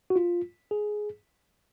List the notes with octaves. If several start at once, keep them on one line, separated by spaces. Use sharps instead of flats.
F#4
F4
G#4